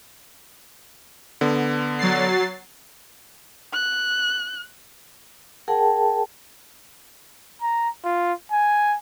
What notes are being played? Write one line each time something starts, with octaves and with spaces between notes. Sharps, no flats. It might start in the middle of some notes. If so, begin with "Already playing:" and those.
D3 B3
F#3 A6 C7
F#6
G#4 A#4 F#5 G5 A5
A#5
F4
G#5